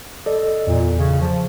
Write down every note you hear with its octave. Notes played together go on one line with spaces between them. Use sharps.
A4 D5 D#5
E2 A#2
C#3
F3